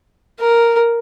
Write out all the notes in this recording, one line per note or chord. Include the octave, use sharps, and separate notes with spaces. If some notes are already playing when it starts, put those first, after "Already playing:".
A#4